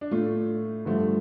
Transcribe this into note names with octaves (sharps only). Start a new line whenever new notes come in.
D4
A2 A3 F4
G2 D3 F3 A3